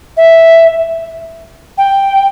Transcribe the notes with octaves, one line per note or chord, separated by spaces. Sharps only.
E5
G5